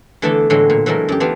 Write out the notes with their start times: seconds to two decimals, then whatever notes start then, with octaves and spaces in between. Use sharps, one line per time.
0.22 D3 E3 A3 B3 D4 A4
0.50 A2 D3 E3 F#3 G#3
0.70 A#2
0.86 E3 F#3 G#3 A3 A#4
1.08 F#2 G4
1.20 E3 B3 D4 F4 G4